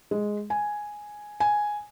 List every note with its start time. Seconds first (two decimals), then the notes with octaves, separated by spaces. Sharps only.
0.11 G#3
0.50 G#5
1.40 G#5